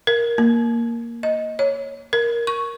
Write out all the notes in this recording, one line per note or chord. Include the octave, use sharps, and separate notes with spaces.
A#4
A#3
D#5
C#5
A#4
C#6